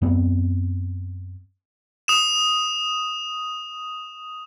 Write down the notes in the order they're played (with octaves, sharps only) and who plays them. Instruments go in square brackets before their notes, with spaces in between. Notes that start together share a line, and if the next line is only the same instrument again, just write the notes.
[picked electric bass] F#2 B3 C4
[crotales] D#6 E7